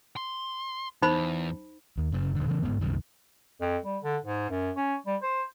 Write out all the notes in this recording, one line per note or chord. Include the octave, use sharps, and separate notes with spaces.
C6
E2 D#4 C5 B5
D#2
F#1 C#3
D#1 D3
C#3 E3 C#4
G1 E2 G#2 B3
C2 F#2 C3 D#3
F2
G3
D3
G#2
F#2
C#4
G3
C5